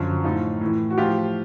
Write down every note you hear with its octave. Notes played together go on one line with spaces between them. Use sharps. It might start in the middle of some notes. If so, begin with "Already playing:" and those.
Already playing: F#2 D3 F3
A2 F3 D#4 F4
A2 E3
F#4
A2 F3 F4 G4